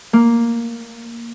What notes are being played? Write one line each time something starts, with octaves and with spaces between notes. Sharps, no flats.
A#3